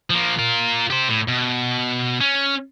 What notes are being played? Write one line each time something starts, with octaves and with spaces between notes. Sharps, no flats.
F3 A#3
F4 A#4
G4 C5
A2
B2
C#4